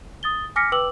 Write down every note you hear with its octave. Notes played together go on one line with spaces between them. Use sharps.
D#6 A6 G7
G#5 D6 F6 A#6 B6 C#7
B4 G5 D6 E6 F#7